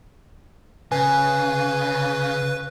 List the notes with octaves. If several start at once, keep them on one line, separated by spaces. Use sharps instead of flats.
C#3 B4 G#5